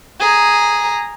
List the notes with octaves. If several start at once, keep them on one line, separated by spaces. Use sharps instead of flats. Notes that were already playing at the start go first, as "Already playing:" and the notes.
G#4 A#5